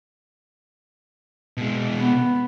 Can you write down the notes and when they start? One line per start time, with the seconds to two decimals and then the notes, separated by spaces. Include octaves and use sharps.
1.57 B2 G#3
1.97 B3